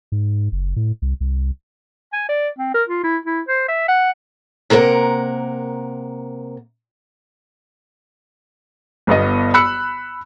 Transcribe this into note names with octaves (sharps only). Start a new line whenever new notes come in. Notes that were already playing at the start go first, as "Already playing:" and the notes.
G#2
F#1
A2
C2
C2
G#5
D5
C4
A#4
F4
E4
E4
C5
E5
F#5
C3 A#3 A#4 C5 F#5
G1 G2 B3 D#5
B5 E6 F#6 C#7